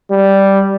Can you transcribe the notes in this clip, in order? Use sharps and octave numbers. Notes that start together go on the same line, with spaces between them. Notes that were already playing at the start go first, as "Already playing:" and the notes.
G3